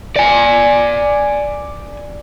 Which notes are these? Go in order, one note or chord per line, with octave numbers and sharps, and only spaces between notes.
D5 G#5